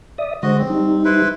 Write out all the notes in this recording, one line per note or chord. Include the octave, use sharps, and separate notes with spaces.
D5 E5 D#6
D3 G#3 F#4 C5 D#5
C4
G3 D#4
E4 B4 C5